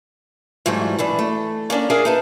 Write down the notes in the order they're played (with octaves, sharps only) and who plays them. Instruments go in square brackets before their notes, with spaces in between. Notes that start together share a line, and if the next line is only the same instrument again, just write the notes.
[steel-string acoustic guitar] G#2 E3 F#3 G3 A3
B2 E3 D4
A3
A#3 C#4 D4 D#5
D4 G#4 A#4 E5 F5 G#5
D#4 B4 A5